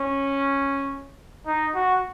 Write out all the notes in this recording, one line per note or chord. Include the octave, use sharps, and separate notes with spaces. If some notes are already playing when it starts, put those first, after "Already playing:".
Already playing: C#4
D#4
F#4